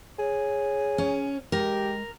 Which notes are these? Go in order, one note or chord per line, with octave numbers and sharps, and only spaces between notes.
G#4 C#5
C#4
G#3 G4 A#4